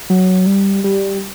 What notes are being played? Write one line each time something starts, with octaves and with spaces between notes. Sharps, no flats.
F#3
G3
G3